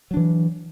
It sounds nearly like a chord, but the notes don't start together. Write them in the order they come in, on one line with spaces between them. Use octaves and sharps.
F#3 D4 E3